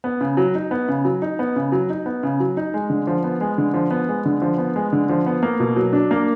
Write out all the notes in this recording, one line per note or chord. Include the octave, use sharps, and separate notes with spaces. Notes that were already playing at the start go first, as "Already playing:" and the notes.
B3
C#3
F#3
D#4
B3
C#3
F#3
D#4
B3
C#3
F#3
D#4
B3
C#3
F#3
D#4
G#3
D3
F3
B3
G#3
D3
F3
B3
G#3
D3
F3
B3
G#3
D3
F3
B3
A#3
B2
F#3
D4
A#3